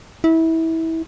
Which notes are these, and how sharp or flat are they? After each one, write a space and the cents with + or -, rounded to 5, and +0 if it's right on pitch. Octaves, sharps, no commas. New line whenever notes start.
E4 -25